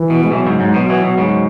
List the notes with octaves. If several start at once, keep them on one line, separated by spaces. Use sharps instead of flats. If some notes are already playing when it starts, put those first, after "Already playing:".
Already playing: E3
B2
G#3
B2 E3 F#3
G#2 C#3
G#2
B2
B2 E3
B2
G#2 C#3